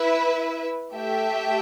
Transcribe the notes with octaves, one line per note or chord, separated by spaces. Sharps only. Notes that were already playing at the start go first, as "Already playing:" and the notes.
Already playing: E4 B4 E5
A3 G4 E5 G5